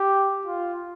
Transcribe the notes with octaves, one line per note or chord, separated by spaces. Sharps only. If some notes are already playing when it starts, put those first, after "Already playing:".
Already playing: G4
F4